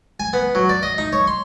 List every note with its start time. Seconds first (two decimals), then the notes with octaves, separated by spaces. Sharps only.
0.20 G#5
0.33 B3
0.55 F#3
0.69 D5
0.83 D#5
0.98 D#4
1.13 C#5
1.27 C6